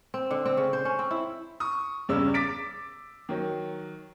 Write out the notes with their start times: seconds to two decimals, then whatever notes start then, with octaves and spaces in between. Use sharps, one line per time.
0.14 C4
0.31 D3
0.46 C4
0.57 C#3
0.73 C5
0.85 C#4
0.99 C4
1.11 E4
1.60 C#6 D#6
2.09 E2 G2 C#3 C#4 D5 E6
2.34 D6 A6 B6 D7
3.29 D#3 F#3